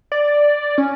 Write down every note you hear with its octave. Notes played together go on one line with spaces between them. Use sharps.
D5
C#4